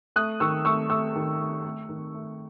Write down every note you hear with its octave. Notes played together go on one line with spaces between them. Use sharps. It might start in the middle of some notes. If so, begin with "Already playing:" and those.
A3 D#6 F#6
D#3 C#6 E6
A3 C#6 E6
A3 C#6 E6
D#3
A3
A3
D#3
A3